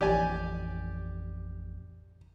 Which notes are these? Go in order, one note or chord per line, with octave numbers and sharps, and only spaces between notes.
A1 F2 G4 D5 G#5